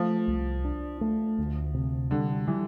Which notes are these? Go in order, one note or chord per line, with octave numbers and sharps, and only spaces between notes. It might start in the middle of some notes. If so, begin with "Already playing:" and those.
Already playing: F3 A3
C2
D4
A3
D2
C3
D3 G3
E3 G3